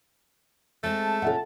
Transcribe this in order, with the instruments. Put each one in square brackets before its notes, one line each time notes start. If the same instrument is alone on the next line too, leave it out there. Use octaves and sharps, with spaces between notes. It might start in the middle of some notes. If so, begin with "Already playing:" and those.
[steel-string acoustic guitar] G#3 C4 [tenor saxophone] A3 [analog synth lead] A5
[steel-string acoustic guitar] A#2 C#4 [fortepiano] A4 E5 F#5